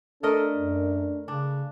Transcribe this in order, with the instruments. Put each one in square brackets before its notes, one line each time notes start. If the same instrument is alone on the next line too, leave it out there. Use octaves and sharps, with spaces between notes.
[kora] A3 A#4 D#5 [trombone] D4 [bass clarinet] A4
[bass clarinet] F#2
[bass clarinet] C#3 [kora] D4